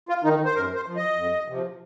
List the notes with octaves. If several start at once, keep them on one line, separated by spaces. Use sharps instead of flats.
F4
D#3 D#4
C5
F#2 A#4
C5
F3
D#5
F2
C3 F3